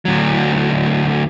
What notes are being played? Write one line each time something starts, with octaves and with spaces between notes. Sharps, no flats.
D2 F#3